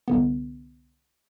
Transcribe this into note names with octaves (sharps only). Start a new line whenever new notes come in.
C2 D3 B3